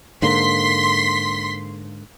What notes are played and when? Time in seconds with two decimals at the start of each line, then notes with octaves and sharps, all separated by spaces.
0.22 G#2 D3 A#3 C6 B6